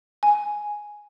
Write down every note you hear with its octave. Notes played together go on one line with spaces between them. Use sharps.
G#5